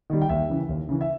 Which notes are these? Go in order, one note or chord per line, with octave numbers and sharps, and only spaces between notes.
D#3 G3
G5
D#2 E5
C#3 E3
D#2
C#3 E3
E5